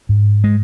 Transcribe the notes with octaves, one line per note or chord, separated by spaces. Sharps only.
G#2
G#3